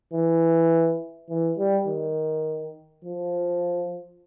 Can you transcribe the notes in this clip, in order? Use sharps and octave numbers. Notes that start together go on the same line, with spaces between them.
E3
E3
G3
D#3
F3